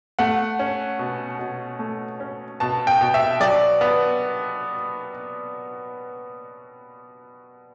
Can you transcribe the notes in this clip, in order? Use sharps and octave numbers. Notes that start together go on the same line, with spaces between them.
A3 F#5
C#4
B2
B2
A3
C#4
B2 A5
G5
B2
E5
F#3 D5
B3